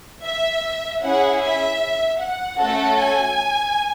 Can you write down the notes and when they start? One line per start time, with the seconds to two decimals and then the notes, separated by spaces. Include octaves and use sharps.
0.23 E5
1.02 C#4 E4 G#4 F#5
1.41 E5
2.19 F#5
2.58 A3 C#4 F#4 A4
2.97 G#5